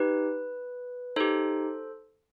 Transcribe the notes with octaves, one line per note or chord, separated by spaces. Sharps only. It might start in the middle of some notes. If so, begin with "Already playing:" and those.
Already playing: D#4 G4 B4
D#4 G4 A4 C5